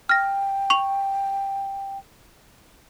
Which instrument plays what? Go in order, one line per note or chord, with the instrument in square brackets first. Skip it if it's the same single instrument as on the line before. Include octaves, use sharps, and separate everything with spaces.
[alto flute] G5 [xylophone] F6 A#6
[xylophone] C#6 F7